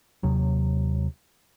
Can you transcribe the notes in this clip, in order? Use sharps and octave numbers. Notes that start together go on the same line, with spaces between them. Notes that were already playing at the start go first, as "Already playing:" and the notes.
D#2 C3 F#3